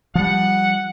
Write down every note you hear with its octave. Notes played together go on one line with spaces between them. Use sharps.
F3 G3 F#5